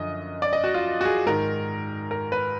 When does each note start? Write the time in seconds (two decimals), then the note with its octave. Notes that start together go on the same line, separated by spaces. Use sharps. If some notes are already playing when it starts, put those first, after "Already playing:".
Already playing: F#2 D3 F3 D#5
0.42 D5
0.53 D#5
0.64 F#4
0.74 F4
1.01 F#4
1.05 G#4
1.26 G#2 D#3 A#4
2.11 A#4
2.32 B4